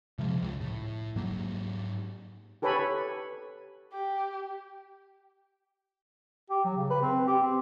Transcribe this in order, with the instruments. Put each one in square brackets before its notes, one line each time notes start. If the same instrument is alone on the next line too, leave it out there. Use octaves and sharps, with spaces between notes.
[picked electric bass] C3 F3 F#3 G#3
C#2
A2
G#2 F#3 A#3
[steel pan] G4 A4 B4 C#5 G#5 B5
[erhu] G4
[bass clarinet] G4
F#3
C#3
B4
C4
G4
C4